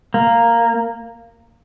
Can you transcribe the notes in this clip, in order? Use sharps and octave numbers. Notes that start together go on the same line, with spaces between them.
A#3